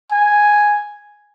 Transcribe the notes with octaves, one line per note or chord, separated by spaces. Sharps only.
G#5